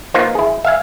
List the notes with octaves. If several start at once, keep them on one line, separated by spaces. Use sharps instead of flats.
A#3 B3 D#4 F4 C5
E4 G#4
E5 F5 G#5